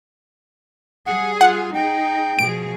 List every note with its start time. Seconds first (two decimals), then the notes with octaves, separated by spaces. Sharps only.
1.06 G3 G#4 F#5
1.41 F4 F#5
1.74 D#4 G#4 G5
2.39 B2 F3 G#4 D7